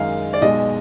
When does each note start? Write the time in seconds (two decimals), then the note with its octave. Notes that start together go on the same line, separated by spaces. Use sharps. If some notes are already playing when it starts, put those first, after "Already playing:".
Already playing: F#2 D#3 G#3 F5
0.33 D5
0.41 B1 B2 G#3 D#5